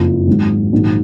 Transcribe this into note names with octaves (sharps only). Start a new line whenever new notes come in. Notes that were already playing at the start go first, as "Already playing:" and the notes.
Already playing: F#1 F2 F3
G#1 G#2 F#3
A#1 G#2 D#3 F#3